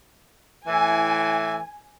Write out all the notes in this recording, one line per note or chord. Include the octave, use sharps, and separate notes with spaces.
A2 E3 G#5